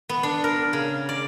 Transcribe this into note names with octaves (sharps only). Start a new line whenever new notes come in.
B3
D4
A#4
C#3
D5